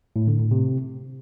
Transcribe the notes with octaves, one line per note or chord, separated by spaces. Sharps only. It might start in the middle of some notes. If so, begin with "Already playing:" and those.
A2
D3
A2
C3